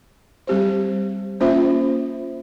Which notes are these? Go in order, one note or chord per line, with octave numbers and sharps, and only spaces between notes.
G3 C4 G4 C5
A#3 C#4 F4 C5 E5